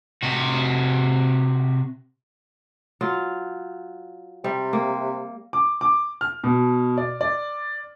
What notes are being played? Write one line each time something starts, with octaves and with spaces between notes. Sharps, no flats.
C3 F#4
F#3 F4
C3 G3
A#3
D6
D6
F6
B2
D5
D5